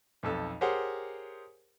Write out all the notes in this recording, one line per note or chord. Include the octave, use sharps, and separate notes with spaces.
B1 F2 A4
G4 G#4 A#4 C5 C#5 F#5